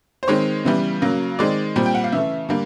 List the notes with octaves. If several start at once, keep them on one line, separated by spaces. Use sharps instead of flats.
C5
D#3 G#3 C4 C#5
C#3 E3 G3 B3
C#3 F#3 A#3
D#3 G#3 C4 D5
A#2 G3 C4
G5
F#5
F5
C#3 E3 A3 E5
D3 G3 A#3